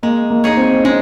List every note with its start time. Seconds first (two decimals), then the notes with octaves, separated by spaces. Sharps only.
0.03 G#3 A#3
0.30 A#3
0.44 D#4 G#4 C#5
0.57 C4
0.84 G#3 C#4